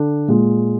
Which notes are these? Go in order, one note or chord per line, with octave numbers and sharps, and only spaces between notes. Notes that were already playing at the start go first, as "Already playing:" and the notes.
Already playing: D3 D4
A#2 G#3